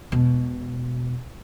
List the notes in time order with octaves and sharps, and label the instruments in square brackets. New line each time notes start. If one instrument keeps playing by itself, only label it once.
[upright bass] E1 B2